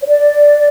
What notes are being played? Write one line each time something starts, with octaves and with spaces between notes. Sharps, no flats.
C#5
D5